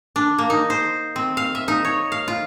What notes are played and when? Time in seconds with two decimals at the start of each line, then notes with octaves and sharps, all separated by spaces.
0.16 D4
0.38 A#3
0.50 D#4
0.70 C5
1.16 C4
1.37 F5
1.55 E5
1.68 D#4
1.85 C#5
2.12 F5
2.28 F4